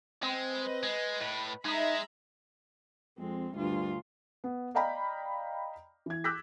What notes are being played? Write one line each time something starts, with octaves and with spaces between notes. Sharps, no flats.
G#3 C4
B4 D#5
G#3
A2 B4
G#3 D#4 E5 A#5 B5
F2 G#3 C4
D2 G2 F4
B3
D5 D#5 F5 G5 A#5 B5
E3 G#6
D6 E6 F#6 G6 A#6 B6